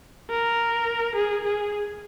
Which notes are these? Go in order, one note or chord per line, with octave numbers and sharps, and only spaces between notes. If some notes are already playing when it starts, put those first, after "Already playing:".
A#4
G#4
G#4